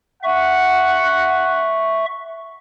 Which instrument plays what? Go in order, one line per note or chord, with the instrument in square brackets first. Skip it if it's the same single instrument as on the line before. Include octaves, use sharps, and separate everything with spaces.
[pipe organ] E5 C#6 [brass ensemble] F#5